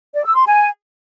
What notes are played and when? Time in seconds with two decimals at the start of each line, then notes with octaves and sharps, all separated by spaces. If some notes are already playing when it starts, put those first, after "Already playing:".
0.14 D5
0.25 E6
0.36 C6
0.47 G#5